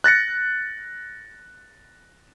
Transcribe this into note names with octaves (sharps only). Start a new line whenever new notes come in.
F#6 A6 A#6 C#7